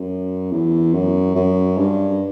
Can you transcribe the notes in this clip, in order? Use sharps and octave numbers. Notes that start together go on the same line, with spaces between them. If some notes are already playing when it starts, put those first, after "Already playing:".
Already playing: F#2
E2
F#2
F#2
G2